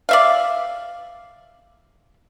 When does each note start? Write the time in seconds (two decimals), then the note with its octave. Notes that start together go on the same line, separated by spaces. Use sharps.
0.09 D5 E5 F5